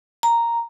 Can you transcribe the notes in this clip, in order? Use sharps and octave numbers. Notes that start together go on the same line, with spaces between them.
A#5